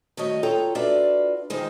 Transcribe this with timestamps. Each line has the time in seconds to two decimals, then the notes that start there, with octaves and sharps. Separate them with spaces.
0.17 D#3 G3 A3 F#4 C#5 D#5
0.43 F4 A4 C#5 G5 A#5
0.75 D4 F4 F#4 B4 D5 E5
1.50 E2 D#3 F3 G#3 C4 D#4